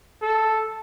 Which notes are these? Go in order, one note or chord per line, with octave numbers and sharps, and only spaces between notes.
A4